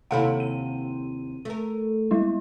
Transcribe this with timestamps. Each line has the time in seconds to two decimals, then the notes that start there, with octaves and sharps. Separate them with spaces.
0.11 D#2 C3 E4 A4 F5 F#5
0.40 D#7
1.45 A3 A#4
2.11 G3 G#3 E4